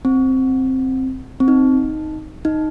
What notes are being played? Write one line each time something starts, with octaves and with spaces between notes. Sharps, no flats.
C4
C4
D#4
D#4